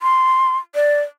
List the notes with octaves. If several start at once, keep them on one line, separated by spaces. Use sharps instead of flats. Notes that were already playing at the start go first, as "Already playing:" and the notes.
C6
D5